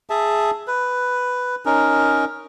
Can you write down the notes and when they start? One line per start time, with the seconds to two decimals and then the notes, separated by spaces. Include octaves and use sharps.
0.10 G#4 E5 A5
0.67 B4
1.66 C#4 D#4 A#4